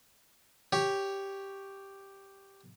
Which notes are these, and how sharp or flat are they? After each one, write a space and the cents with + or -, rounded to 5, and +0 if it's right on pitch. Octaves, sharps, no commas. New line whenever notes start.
G4 +0 C#5 +0